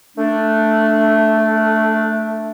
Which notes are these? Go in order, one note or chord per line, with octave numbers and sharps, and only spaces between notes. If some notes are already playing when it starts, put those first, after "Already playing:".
A3 D4